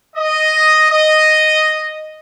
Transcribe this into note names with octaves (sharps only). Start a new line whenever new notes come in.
D#5
D#5